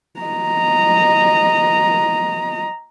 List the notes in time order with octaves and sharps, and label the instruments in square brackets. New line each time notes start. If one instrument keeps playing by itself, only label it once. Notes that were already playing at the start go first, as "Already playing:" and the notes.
[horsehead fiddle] D#5 A#5